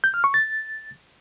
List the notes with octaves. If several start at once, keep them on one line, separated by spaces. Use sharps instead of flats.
G6
F6
C#6
A6